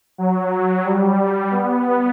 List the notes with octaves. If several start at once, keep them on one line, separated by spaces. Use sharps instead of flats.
F#3
G3
B3